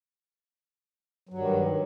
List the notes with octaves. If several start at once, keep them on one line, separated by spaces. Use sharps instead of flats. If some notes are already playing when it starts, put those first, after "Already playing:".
G2 D#3 F#3